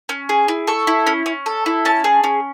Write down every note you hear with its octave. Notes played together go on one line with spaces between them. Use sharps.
C#4
G#4
E4
A4 C#6
E4
C#4
C#4
A4
E4
C#4 A5
G#4
C#4